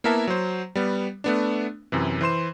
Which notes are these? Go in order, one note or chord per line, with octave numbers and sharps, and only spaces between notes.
A#3 B3 E4 A#4 E5 A5
F#3 C5
G3 B3
A3 B3 D4
F#2 C3 E3
E3 C5 C6 E7